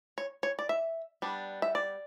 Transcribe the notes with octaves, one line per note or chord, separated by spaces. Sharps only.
C#5
C#5
D5
E5
G3 B3 D4
E5
D5